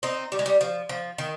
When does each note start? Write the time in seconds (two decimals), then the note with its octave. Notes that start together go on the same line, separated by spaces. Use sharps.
0.03 C4 D#4
0.32 G3
0.39 G#3
0.46 G3
0.61 F3
0.89 F3
1.18 D#3